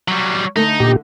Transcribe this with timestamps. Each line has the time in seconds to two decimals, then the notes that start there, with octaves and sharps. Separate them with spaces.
0.08 F#3 G3
0.56 D3 A3 D#4
0.80 A#2 G4